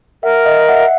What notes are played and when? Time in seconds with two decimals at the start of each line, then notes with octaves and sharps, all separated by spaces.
0.23 A#4 E5 F#5
0.46 D#5 F5
0.68 E5 F#5